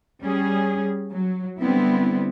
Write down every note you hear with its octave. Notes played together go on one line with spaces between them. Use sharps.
G3 C#4 G#4
F#3
D3 G3 B3 C4 E4